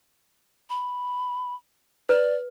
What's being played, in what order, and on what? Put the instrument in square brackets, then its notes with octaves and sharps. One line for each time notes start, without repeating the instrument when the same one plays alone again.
[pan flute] B5
[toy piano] B4 [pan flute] D5